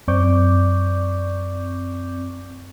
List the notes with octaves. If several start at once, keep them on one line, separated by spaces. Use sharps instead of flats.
F#2 C4 D5 C#6 D6 G6